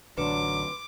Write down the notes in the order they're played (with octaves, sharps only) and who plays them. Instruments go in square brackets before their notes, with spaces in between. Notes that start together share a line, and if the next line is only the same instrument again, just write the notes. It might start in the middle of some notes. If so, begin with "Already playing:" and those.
[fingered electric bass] A1 D3 [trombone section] F#3 D4 [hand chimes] B4 C6 [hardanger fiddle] D6